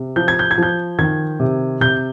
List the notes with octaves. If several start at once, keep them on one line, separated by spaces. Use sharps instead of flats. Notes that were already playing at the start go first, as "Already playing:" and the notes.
Already playing: C3
F3 G6
G#6
G6
G#6
F3 G6
D#3 G#6
C3
C3 G6